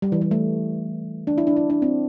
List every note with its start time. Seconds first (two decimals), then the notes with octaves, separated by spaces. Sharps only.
0.02 G3
0.12 E3
0.21 G3
0.31 A3
1.27 D4
1.38 E4
1.47 D4
1.56 E4
1.70 D4
1.82 C4